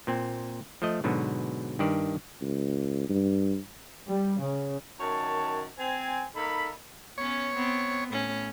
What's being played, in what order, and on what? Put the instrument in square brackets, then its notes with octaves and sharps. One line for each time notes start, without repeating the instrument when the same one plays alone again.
[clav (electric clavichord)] A#2 C4
F3 A3 D#5
G#2 B2 D3 F#3
G2 D#3 D5
[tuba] C#2
G2
[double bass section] G3
C#3
[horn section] F#2 D#3 C#5 A5
C4 G#5
A#3 D#4 A4 B5
[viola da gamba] B3 C#4 [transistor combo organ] C#5
[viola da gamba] B3 C4
A2 C#4